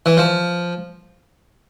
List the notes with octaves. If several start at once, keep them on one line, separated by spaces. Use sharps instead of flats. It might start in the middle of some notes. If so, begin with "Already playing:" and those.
E3
F3